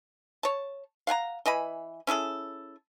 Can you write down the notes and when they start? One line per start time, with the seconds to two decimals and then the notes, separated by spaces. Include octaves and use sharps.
0.43 C#5 A5
1.07 F5 F#5 G#5 A#5
1.46 E3 D#5 G#5 B5
2.07 C#4 E4 G#4 A4